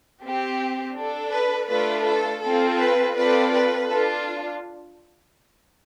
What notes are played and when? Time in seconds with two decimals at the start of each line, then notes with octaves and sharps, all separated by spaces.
0.24 C4 G4
0.97 D4 A4
1.33 B4
1.70 A3 D4 F4 A4 B4
2.06 A4
2.44 C4 F4 A4
2.80 B4
3.17 C4 F4 A4 B4 D5
3.54 B4
3.90 D4 F4 A4